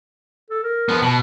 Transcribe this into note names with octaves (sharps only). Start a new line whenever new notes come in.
A4
A#4
F3 B3
B2 A5 F#7